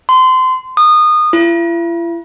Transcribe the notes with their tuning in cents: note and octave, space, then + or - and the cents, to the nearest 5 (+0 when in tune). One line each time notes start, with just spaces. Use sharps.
C6 -25
D#6 -25
E4 +45